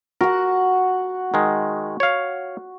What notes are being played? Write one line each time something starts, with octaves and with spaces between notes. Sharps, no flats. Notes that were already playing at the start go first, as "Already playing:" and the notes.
F#4 A#4 F#5
D#3 G#3
C#5 F5